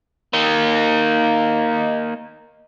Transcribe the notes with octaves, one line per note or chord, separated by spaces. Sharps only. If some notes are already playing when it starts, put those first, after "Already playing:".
A#3 D#4